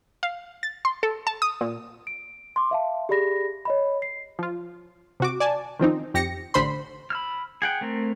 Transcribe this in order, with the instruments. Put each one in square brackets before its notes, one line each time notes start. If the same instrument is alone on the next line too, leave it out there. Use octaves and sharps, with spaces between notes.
[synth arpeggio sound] F5
A6
C6
A4
A5
D#6
A#2
[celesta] D7
C6 D6
E5 F5 A5
G4 G#4 D5 B5 A#6
C#5 D#5 B5
C7
[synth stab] F3 F4
C3 F#4 D6
D5 G#5 A5
D#3 F3 C4 D#4
F2 G4 A#6 C#7
A1 D3 C5 B5 C6
[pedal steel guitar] B5 E6 F6
G#4 F#5 G5
A3 C4 A#4